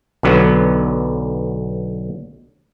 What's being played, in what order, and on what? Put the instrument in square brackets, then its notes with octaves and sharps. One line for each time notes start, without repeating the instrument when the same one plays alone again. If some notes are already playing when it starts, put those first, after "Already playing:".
[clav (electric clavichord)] B1 D3 F#3 B3